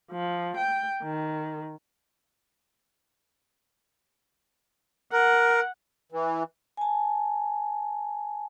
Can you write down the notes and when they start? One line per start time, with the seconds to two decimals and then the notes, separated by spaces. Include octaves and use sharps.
0.12 F3
0.57 G5
1.03 D#3
5.13 A#4 F#5
6.12 E3
6.77 G#5 A5